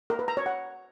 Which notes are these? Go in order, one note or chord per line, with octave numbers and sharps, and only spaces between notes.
A#4
B4
A#5
C#5
F#5